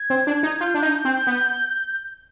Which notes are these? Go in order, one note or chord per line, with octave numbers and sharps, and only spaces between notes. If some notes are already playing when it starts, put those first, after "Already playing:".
Already playing: G#6
C4
D4
D#4
F4 G6
D4
D#4
C4
B3